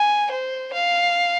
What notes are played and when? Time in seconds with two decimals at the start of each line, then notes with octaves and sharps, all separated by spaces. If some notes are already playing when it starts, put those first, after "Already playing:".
Already playing: G#5
0.31 C5
0.73 F5